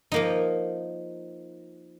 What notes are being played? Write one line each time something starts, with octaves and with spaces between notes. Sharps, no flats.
F3 A#3 D#4